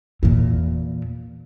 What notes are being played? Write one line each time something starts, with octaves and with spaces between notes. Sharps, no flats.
E2 A#2